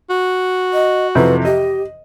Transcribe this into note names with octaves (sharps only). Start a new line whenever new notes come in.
F#4
D#5
F2 C3 E3 B4
G4 D#5